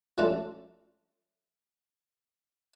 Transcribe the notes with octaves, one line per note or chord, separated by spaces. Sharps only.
F3 G3 A3 C#4 D4 F4